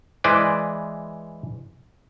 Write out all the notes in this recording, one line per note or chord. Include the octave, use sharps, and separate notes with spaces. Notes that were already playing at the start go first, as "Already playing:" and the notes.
E3 G#3 B4 C5 D5